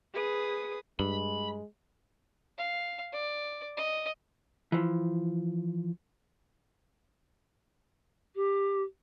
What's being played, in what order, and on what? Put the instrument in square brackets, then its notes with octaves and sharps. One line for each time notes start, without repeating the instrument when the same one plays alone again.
[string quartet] G#4 B4 D#6
[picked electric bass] G2 [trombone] G#3 [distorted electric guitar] B5
[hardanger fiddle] F5
D5
D#5
[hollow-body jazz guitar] E3 F3
[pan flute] G4